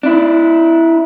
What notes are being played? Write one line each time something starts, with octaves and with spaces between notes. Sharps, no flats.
D4 E4